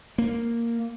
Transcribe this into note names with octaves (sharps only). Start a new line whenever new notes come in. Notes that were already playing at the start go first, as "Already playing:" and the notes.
A#3